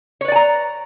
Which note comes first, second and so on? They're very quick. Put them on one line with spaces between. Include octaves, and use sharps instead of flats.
C#5 B4 D5 G#5 A#5